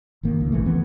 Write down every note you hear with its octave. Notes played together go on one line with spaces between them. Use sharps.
F#1 G2 D#3 A#3
C#2
A#1 E3 A3
F2 E3 B3